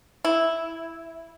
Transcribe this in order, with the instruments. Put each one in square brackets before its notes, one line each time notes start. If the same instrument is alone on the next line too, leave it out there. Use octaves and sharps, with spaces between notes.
[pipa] E4